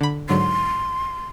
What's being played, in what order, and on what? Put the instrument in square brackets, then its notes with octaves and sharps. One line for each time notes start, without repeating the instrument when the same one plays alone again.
[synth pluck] D3 B5
[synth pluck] G#2 D3 F#3 [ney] C6